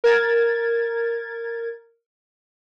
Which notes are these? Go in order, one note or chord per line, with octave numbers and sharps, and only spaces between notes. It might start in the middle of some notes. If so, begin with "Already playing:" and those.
A#4 G#6 A6